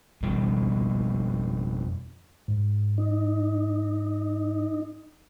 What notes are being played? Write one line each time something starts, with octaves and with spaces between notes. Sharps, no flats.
F2 B2 G3
G#2
D#4